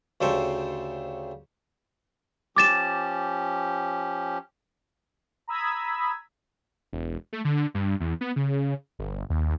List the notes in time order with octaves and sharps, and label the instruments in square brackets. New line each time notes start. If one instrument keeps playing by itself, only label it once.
[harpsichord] D2 C#3 G4 A4 C5 C#6
[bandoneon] F3 C#4 G4 [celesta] D6 A6 E7
[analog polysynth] A#5 B5 D#6 E6 G#6 B6
[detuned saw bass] E1
A3
D3
G2
E2
B3
C#3
G1
D#2